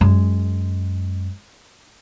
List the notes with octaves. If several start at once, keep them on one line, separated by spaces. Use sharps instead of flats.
F#2 G#3